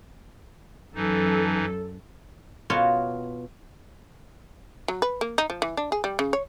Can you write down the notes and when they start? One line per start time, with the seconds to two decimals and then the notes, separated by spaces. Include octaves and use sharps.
0.95 F#2 E3 D#4 A4
2.70 B2 F4 F#4 A#4 C#5 A5
4.88 F#3
5.02 B4
5.21 A#3
5.38 D#4
5.50 F3
5.62 E3
5.77 D4
5.92 G#4
6.04 G3
6.19 C#3
6.33 C#5